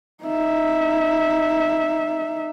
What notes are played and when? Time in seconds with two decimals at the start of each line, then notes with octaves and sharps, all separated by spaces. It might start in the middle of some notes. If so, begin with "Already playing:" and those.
0.24 D#4 E5